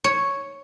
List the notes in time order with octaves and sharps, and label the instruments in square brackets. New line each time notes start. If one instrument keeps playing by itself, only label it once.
[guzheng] C#5